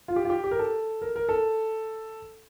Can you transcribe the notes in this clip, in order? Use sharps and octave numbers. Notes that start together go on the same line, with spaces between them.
F4
G4
F4
G4
G4
A#4
A4
A#4
A#4
A4